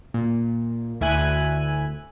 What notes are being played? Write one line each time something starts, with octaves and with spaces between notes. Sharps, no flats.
A#2
D2 E4 E5 G#5 F#6 D#7